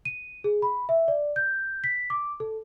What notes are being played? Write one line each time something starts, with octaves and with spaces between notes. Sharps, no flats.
D#7
G#4
B5
E5
D5
G6
B6
D6
A4